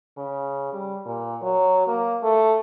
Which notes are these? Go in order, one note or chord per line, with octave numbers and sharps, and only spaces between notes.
C#3
G3
A#2
F#3
A#3
A3